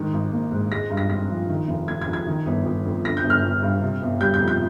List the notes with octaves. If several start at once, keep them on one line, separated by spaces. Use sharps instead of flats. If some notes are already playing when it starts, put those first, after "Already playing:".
Already playing: G#2 D#3
G#1
A#3
G#2
G#3 A#6
G2
A#6
C4 A#6
F3
D#3
F1
F1 G#6
G#6
F2
G#6
D#3
G1
G1
F2
D3 A#6
G6
G1
F6
G1
G2
C3
G1
G3 G6
G6
F2
G6